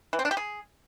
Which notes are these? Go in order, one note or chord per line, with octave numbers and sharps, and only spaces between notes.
E3
C4
D4
G4
G#4